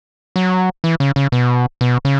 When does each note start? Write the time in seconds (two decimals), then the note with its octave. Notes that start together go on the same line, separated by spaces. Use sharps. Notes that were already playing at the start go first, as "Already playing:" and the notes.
0.36 F#3
0.84 E3
1.00 C#3
1.16 C#3
1.32 B2
1.81 B2
2.05 C#3